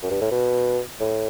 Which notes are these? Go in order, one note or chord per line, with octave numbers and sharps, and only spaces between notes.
F#2
G2
A2
B2
A2